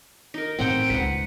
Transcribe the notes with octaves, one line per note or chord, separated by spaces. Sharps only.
D#4 A#4
A2 E3 C4 F#5 G5
C#2 B4 F#5